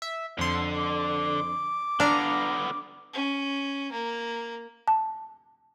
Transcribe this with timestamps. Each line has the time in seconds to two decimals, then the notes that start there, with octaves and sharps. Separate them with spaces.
0.02 E5
0.38 F2 D3 C6
0.75 D6
2.00 D3 B3 D4 F5 A#5
3.13 C#4
3.92 A#3
4.88 A5